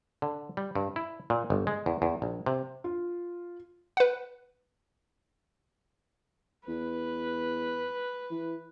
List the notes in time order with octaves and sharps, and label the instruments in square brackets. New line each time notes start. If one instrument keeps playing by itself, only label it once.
[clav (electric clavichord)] D3
G3
G2
E4
A#2
G1
G#3
E2
E2
A#1
C3
[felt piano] F4
[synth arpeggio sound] B4 F#5
[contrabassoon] E2 [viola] B4
[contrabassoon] E3